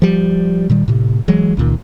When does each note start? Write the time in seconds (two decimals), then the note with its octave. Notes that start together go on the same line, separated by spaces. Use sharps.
0.02 F3 G3
0.70 A#2 D#3 G3
0.88 A2 C3
1.28 E3 F#3 G#3
1.57 C#2 A#2 D#3